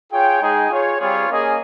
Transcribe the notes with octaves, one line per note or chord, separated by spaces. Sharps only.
F4 G#4 C#5 G5
G#3 D#4 G#4 D#5 G5
F4 G#4 C#5
G3 C4 F4 G#4 C#5
A#3 C#4 G#4 D#5